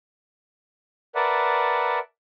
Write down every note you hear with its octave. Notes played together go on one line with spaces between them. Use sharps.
A#4 B4 D5 E5 F#5 A5